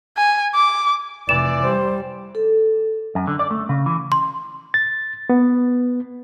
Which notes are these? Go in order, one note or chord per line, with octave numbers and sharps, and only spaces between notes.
G#5
D6
F1 E3 D5 E7
G3 C5
A4
F#2
D3
D5
A3
C#3
E3
C6
A6
B3